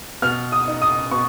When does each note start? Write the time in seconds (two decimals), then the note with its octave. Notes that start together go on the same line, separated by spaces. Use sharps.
0.22 B2 F6
0.52 D#6
0.68 D#4
0.82 D#6
1.11 B2 C#6